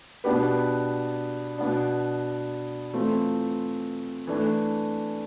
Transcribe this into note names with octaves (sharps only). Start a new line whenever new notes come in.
B2 B3 D4 G4 B4
B2 B3 D4
E3 A3 C4 F4
E3 A3 D4